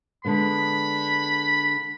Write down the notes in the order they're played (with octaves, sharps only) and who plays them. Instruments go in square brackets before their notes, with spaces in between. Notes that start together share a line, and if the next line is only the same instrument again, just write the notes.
[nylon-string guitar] D3 G#3 B3 [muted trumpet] B5